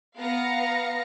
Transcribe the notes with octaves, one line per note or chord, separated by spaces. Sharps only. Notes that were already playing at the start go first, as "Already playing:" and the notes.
B3 F5 A#5 A#6 C#7